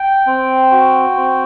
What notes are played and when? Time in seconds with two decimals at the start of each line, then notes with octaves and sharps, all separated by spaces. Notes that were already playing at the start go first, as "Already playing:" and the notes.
Already playing: G5
0.27 C4
0.71 F#4
1.16 C4